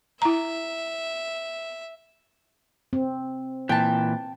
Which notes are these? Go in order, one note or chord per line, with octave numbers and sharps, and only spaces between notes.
E4 E5 A#5
C4
A#2 E3 G5 A5